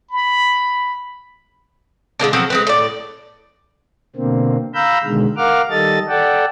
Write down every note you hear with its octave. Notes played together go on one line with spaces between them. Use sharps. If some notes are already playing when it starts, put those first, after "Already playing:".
B5
D3 G#3 A#3 D4
F3 F#3 B3 C4
G#3 C4 B4
A2 D5
B2 D3 A#3 C4
F5 A#5 B5 E6 G6
B2 D3 D#3 G#3
A#4 F5 F#5 D6 F6
D#3 G3 A4 D#5 A6
A4 D5 F#5 G5 A5